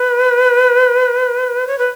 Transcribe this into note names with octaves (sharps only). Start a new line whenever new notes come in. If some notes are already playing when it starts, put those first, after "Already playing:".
Already playing: B4
C#5
B4